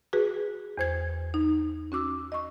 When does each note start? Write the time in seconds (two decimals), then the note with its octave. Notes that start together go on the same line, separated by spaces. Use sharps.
0.13 F#4 G#4 B4
0.77 E2 C5 G#6
1.34 D#4
1.92 C#4 F#4 D6 E6
2.32 D#5 C#6